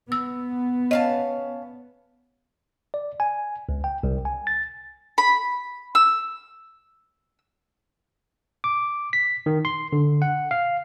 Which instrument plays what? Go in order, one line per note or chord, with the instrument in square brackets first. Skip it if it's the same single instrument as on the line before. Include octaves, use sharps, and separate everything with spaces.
[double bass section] B3 [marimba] E6
[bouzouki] C#4 F5 A5 [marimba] D#5
[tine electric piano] D5
G#5
C#2
G5
C2
G#5
A6
[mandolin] B5
E6
[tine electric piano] D6
B6
D#3
C6
D3
F#5
F5